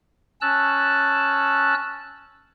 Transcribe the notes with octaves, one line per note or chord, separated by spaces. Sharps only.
C#4 A5 E6 F#6